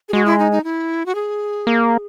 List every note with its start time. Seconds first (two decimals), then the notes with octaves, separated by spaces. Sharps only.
0.09 G#4
0.13 G#3 F#4
0.26 E4
0.39 D#4
0.52 D#4
0.64 E4
1.06 F#4
1.15 G#4
1.67 A#3